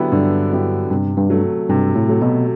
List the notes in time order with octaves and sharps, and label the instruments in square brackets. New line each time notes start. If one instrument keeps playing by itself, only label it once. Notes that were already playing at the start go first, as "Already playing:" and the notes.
Already playing: [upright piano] D3 F#3 B3 E4 G4
[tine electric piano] G2 [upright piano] D3
[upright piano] F#3 B3 E4 G4
[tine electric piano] G2 [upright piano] C3
[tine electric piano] G2
[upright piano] F#3 A3
[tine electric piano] G2 [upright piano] C3
[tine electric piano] A2
[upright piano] F#3 A3
[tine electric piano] B2